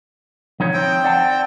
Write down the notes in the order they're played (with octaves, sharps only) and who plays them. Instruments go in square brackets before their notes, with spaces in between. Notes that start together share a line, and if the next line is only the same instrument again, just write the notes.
[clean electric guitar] F3 D#4 C#5
[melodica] C4 G5
[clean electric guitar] D5 F#5 A5